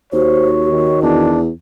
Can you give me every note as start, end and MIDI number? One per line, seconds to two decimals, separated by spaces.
0.13 0.95 39
0.13 1.26 66
0.13 0.48 72
0.13 0.97 73
0.71 1.36 51
1.02 1.49 40
1.02 1.40 62